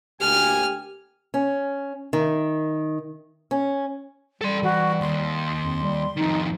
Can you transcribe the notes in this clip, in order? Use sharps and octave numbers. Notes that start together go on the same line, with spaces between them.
D2 A#3 G4 G#5 F6
C#4
D#3
C#4
G3 A4 C6
E3 F#4
D#2 C6
F2
G3
F2 D#3 D#4